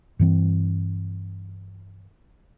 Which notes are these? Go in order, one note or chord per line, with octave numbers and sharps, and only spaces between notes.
G2 E3 C4